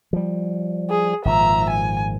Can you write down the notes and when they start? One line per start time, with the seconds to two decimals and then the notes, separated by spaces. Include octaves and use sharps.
0.13 F3 G3
0.90 G#4
1.25 G#1 A#2 F3 E5 A#5
1.70 G#5